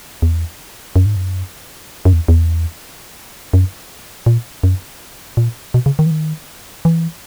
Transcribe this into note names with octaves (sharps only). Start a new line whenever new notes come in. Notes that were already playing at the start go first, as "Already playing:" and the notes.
E2
F#2
G#2
F#2
F#2
E2
E2
F#2
A#2
F#2
A#2
B2
C#3
D#3
E3
D#3
E3